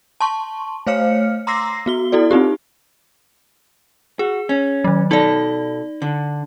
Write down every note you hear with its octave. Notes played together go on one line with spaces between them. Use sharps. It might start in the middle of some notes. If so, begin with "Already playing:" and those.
A5 C6 C#6
A3 C5 C#5 F5 F6 C#7
A#5 C6 D6 E6 A#6 C7
B3 F#4 G7
E4 F#4 A4 D5
C4 D#4 F4 G4
F#4 G#4
C#4
D#3 F#3
B2 D#4 A4 D5
D3